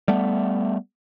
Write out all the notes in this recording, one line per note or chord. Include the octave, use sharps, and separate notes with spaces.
G3 A3 B3